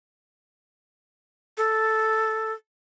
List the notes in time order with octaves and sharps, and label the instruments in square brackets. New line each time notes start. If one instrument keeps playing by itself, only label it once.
[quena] A4